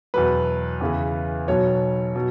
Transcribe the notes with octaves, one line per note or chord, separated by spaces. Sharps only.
E2 B2 F#3 B4
E2 C#3 E3
B1 B2 F#3 C#5
B2 F#3